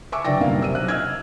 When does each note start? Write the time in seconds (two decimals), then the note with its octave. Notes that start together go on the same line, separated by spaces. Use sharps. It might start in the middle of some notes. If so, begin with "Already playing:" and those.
0.12 E5 G#5 C#6 D6 E6
0.25 D3 F#3 B4 D5 G5 A#6
0.40 F#1 B1 G2 A#3 F5
0.61 C3 E6 D#7
0.75 F#3 F#6
0.88 D#5 E6 F6 G#6